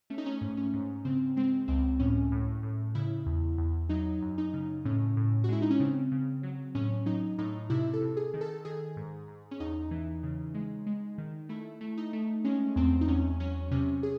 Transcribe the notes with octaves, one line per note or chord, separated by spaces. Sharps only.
A3 C#4
D#4
C#4
G#2
C#4
G#2
C#3 C4
G#3 C4
C#2 C4
A2 C#4
A2
A2
C#3 E4
E2
E2
F#3 D#4
F#2
D#4
C#3
A2 C#4
A2
F#4
G#3 E4
D#4
C#4
C#3 C4
C#3
F#3
A2 C#4
F#3 D#4
A2 D#4
C3 E4
A4
C3
G#4
D#3
A4
D#3 G#4
G#2
G#2
C#4
E2 D#4
E3
C#3
G#3
G#3
D#3
A3 E4
A3
D#4
A3
G#3 C#4
E2 C4
D#4
E2 C#4
F#3 C#4
C3 C#4
G#4